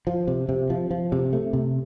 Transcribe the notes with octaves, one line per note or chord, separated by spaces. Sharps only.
F3
C3
C3
F3
F3
C3
A3
C3